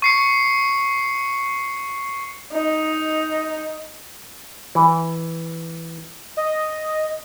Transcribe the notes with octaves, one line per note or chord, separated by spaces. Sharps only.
C#6 C7 C#7
D#4
E3
D#5